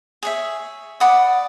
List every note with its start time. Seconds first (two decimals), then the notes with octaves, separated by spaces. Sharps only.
0.23 G#4 C#5 E5
1.00 D5 F#5 B5 D#6